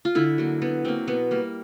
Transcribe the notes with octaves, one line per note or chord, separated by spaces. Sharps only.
F4
D3 E4
F#3 A#3
D3 B3
F#3 A#3 C4
B2 B3
G3 A#3